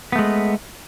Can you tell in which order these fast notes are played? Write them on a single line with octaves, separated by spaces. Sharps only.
B3 A3 G#3